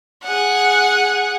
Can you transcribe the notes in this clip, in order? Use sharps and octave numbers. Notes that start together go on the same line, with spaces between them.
G#4 F#5